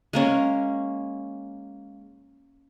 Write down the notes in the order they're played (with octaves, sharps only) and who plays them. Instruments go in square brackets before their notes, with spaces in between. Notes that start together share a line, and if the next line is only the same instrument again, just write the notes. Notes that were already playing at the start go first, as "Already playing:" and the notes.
[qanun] G#3 A#3 C#4